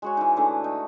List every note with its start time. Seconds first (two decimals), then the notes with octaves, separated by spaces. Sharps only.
0.02 G#3 F#4 C#5
0.17 E3 D#4
0.36 D3 E3 A3 D4
0.64 D#4